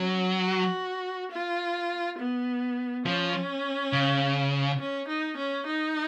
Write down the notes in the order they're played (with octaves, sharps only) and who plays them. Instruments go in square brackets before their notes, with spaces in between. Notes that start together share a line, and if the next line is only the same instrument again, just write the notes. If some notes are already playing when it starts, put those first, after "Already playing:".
Already playing: [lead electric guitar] F#3 [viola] C#4
[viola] F#4
F4
B3
[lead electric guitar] F3 [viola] C#4
[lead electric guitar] C#3
[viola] C#4
D#4
C#4
D#4